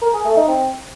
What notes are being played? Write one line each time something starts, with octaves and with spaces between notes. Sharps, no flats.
A#4
G#4
A3
D#4
C4